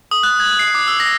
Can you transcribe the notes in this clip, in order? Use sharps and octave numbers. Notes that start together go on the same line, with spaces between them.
D#6
F#6
G#6
C7
D6
E6
A#6